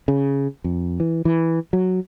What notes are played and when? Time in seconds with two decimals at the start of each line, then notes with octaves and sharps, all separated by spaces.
0.08 C#3
0.64 F2
1.00 E3
1.25 E3
1.73 F#3